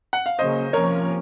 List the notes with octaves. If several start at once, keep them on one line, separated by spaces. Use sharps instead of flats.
F#5
F5
C#3 F#3 A#3 C#4 C5 D#5
C3 F3 A#3 C#4 A#4 C#5